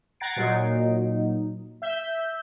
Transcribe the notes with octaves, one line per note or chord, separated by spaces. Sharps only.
F#5 A#5 G#6 A6 C7 D7
A#2 F#3 D#4
E5 G6